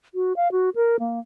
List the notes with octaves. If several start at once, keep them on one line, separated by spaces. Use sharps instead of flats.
F#4
F5
F#4
A#4
A#3